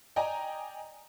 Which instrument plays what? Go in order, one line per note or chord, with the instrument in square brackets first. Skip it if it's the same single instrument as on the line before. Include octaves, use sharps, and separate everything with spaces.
[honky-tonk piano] D5 D#5 G5 G#5 A#5